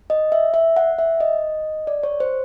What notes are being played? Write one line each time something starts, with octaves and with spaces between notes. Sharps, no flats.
D#5
E5
E5
F#5
E5
D#5
D5
C#5
C5